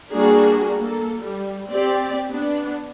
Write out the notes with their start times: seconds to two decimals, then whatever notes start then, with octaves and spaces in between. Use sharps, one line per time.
0.12 G3 A#3 D4 F#4 G#4 A#4
0.79 A#3 A4
1.21 G3
1.71 C4 G4 D5
2.29 B3 D4